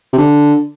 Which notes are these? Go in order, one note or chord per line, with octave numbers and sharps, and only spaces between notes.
C3
D3